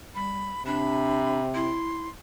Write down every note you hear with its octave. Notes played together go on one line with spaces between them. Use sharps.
G3 B5
C3 D4 B5
E4 C6